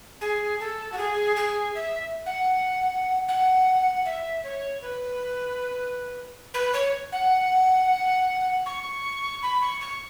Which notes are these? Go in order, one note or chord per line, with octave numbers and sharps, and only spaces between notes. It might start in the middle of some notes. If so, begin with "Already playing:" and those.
G#4
A4
F#4
G#4
G#4
E5
F#5
F#5
E5
C#5
B4
B4
C#5
F#5
C#6
B5
C#6
C#6